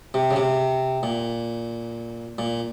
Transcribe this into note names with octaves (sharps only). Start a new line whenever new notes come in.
C3
C#3
C3
A#2
A#2